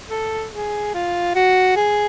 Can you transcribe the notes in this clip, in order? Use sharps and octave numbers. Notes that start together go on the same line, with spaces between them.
A4
G#4
F4
F#4
G#4